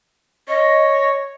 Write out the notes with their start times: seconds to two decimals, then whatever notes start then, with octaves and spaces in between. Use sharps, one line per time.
0.48 C#5 D#5